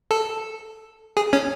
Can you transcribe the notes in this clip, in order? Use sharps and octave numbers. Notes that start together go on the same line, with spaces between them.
A4
G#4
C#4